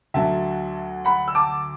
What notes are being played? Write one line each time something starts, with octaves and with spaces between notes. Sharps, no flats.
D2 D3 F#3 E5 A5
F#5 B5
E6
A5 D6